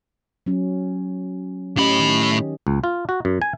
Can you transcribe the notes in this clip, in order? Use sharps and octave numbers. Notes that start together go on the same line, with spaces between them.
F#3 C#4
A2 C#4 G4 D#5 B5
D#3
C#2
F4
F#4
F#2
G#5